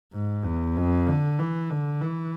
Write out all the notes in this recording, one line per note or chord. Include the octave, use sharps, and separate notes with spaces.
G#2
E2
F2
D3
E3
D3
E3